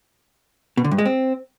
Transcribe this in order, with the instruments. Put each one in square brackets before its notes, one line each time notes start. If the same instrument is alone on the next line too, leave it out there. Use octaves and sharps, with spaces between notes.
[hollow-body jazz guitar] B2
D3
G2
G#3
C4